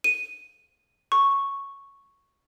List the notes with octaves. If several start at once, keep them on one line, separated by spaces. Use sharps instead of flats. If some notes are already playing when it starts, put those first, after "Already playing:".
D#7
C#6